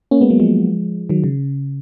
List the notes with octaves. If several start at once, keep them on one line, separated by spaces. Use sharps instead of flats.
A#3 C#4
G#3 B3
F#3 A#3
F3 G#3
D#3 F#3
C#3